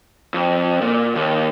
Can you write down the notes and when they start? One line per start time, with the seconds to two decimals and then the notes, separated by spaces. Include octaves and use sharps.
0.34 F2
0.81 A#2
1.15 D#2